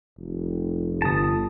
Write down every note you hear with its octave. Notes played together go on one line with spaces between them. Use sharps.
F1
G1 A5 D#6